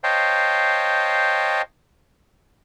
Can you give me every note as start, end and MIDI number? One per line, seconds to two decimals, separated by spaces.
0.04 1.62 72
0.04 1.62 73
0.04 1.62 75
0.04 1.62 77
0.04 1.62 79
0.04 1.62 81